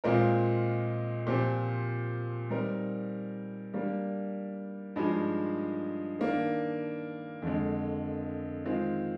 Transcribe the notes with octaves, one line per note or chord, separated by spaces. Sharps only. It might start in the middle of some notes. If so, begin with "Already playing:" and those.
A#2 G#3 C4 F4 A#4
A#2 F3 C4 G4 C5
G3 C4 D#4 A#4
G3 A#3 D4
G2 F3 G#3 D#4 G#4
D#3 A#3 D4
F2 D3 G#3
D#3 G#3 C4 F4